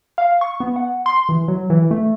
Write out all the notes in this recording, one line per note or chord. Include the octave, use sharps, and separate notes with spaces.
F5
C#6
B3
F#5
C6
E3
F#3
E3
A3